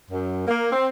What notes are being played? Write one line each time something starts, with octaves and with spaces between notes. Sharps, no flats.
F#2
A#3
C4